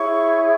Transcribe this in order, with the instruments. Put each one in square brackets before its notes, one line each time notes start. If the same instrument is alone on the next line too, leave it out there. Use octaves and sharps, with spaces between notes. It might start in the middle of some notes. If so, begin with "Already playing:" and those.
Already playing: [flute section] E4 G#4 C#5 C#6